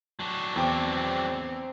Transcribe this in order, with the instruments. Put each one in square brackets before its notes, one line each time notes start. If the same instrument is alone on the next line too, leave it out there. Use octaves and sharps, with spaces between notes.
[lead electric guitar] F#3 D4
[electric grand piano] E2 G5 D6 [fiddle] C4